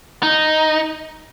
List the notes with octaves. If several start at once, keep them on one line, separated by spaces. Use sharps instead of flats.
D#4